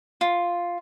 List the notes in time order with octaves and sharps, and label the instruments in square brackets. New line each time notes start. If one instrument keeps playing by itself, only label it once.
[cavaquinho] F4